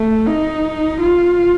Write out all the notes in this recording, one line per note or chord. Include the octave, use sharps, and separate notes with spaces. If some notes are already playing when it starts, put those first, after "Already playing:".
Already playing: A3
D#4
F4